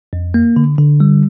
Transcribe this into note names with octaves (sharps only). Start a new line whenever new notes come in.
F2
A#3
D3
D3
G3